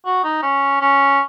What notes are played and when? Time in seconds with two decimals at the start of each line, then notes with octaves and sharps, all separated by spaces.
0.06 F#4
0.24 D#4
0.42 C#4
0.81 C#4